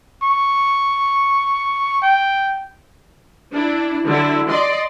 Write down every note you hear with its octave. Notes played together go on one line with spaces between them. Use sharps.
C#6
G5
D4 E4
D3 F#3 E4
D5 D#5 C6